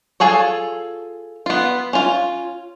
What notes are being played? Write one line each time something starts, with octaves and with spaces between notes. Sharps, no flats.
F4 G#4 A4 C#5
B3 F4
C#4 F4